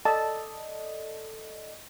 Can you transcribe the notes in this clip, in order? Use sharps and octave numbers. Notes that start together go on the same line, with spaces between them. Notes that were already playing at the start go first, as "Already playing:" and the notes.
A4 D5 D#5 A5